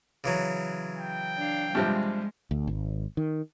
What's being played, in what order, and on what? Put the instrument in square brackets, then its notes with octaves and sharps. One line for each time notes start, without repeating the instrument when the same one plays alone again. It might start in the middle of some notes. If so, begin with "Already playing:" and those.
[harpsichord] C#3 E3 F#3
[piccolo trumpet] G5
[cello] D4 F5
[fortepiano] G2 C3 F3 [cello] G3 G#3
[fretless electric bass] D2
G#1
D#3